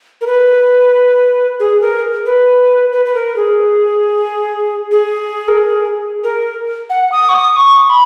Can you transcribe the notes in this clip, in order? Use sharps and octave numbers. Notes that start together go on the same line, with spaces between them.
A#4
B4
G#4
A#4
B4
B4
B4
A#4
G#4
G#4
A#4
G#4
A#4
F#5
D#6
C#6
D#6
C#6
B5